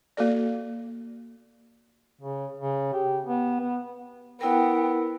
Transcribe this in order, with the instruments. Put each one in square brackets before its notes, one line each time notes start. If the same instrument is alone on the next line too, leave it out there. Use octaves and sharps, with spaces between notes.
[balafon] A#3 F#4 A4 D5
[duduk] C#3
C#3
G4
B3
B3
[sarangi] B3 [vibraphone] E4 A#4 [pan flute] G5